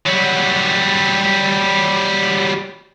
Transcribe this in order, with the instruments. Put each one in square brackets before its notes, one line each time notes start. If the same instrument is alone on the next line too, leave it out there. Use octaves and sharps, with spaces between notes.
[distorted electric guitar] F#3 G3